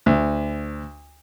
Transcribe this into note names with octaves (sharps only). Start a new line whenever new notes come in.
D2